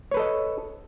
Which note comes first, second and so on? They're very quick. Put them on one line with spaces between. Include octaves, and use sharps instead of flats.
C#5 B4 A4 D#5